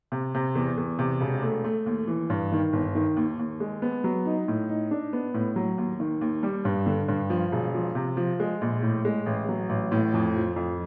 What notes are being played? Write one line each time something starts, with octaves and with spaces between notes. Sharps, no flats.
C3
C3
E2
E2
C3
E1
A3
A3
D#2
E3
G2
D#3
G1
D#3
D#2
D#2
G#3
B3
F#3
D#4
A2
D#4
D4
B3
A2
F#3
D#2
D#3
D#2
G3
G2
D3
G2
F3
E1
F3
C3
F3
G#3
A#1
A2
G#3
A1
F#3
A1
A2
F2
F3
F2